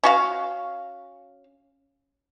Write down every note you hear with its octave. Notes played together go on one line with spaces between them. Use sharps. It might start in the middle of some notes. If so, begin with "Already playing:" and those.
C#4 F#4 F5